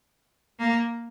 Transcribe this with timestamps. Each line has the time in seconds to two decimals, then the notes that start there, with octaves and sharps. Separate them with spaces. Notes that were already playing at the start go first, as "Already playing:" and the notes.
0.59 A#3